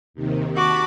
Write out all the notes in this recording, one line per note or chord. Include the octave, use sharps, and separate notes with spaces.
D#2 C3 D#3
F#4 A5 B5 D6